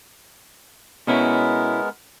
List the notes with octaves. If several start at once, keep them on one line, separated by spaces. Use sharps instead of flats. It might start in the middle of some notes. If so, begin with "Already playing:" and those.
B2 G#3 B3 C#4 E4 A#4